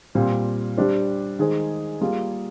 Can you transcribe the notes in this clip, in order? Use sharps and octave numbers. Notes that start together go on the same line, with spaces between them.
A#2 G3 C4
G3 D4 G4 C5
D#3 G#3 D#4 G#4 C5
G3 A#3 F4 G#4